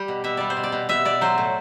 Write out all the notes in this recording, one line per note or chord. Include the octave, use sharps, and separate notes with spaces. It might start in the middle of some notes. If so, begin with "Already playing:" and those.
Already playing: G3 G4
B2
B2 E5
G3 D5
C5
B2
D5
B2
B2 E5
B2 D5
F#3 C5
A2